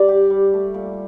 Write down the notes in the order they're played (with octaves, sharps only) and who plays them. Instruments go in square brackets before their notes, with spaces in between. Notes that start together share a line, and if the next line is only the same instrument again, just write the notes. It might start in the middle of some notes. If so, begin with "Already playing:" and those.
Already playing: [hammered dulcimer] G3 D4 [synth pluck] D5
[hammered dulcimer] G4
G3
A3
A#2